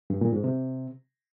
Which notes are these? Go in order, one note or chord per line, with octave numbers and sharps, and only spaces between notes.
G2
A#2
G#2
C3